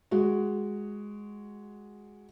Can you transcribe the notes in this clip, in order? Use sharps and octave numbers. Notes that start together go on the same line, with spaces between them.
G#3 F#4